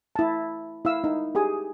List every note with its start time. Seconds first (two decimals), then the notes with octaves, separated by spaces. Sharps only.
0.16 E4 A5
0.85 E4 F5 E6
1.04 D#4
1.35 G4 G#4 G#5 D#6